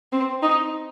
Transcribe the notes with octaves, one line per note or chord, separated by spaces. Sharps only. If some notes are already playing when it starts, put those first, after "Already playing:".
C4
D#4